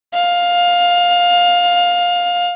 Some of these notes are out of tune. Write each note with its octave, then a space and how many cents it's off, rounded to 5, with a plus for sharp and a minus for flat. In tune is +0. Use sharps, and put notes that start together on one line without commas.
F5 +15